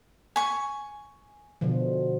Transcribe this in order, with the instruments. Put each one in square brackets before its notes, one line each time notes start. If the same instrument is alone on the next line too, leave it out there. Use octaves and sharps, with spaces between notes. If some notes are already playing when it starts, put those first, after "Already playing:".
[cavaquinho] G#5 C#6
[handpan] B2 D3 F3